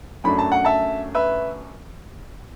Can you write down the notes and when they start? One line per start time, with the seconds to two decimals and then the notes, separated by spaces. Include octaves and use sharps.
0.24 F#2 F#3 A3 D4 B5
0.39 A5
0.52 F#5
0.65 E5 A5
1.15 B4 E5